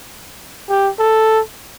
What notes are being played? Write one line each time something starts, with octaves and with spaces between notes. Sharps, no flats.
G4
A4